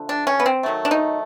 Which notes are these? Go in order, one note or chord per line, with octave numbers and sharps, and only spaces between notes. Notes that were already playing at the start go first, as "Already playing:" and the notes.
Already playing: D3 F3 A3
D4
C#4
B3
C4
D#3 F#3 A3
D4
D#4